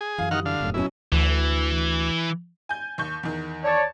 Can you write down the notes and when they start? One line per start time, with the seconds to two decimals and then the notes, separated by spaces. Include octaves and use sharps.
0.01 G#4
0.18 F#2 E3 F5
0.31 D#3 G3 F#5 D#6 F6
0.46 D3 F5
0.60 E1 F#2 A2
0.74 B2 F#3 C#4 E4
1.12 D2 E3
2.69 G#5 G6
2.98 D#2 C#6 G6
3.23 E2 D#3
3.64 C#5 D5 A5